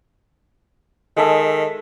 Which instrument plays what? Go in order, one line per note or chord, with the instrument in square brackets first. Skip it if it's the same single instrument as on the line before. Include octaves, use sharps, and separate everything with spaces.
[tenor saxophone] D#3 [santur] G#3 A4 E5